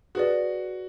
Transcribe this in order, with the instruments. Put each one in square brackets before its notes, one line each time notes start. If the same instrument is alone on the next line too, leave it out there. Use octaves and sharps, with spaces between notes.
[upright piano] F#4 [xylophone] G#4 B4 D5